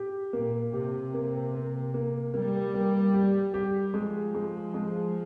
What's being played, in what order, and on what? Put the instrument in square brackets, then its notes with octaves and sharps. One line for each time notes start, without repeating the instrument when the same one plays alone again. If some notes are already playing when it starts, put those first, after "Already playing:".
Already playing: [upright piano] G4
[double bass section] A#2 [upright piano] A#3
[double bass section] C3 [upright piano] G4
[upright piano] A#3
A#3
A#3
[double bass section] G3 [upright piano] A#3
[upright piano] A#3
G4
G4
[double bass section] F3 [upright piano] G#3
[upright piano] G#3
G#3